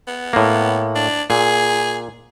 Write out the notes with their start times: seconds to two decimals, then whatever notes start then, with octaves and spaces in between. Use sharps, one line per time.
0.07 B3
0.33 A2 A#3
0.95 D4
1.30 A#2 G#4